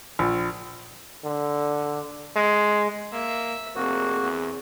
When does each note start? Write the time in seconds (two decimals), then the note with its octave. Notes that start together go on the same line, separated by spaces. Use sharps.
0.19 A#1
1.25 D3
2.36 G#3
3.12 A#3 E5
3.75 F1 A#3 C4 F#4 G#4
4.23 E2